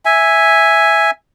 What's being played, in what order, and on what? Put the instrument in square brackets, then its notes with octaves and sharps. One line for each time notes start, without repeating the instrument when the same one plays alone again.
[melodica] E5 G#5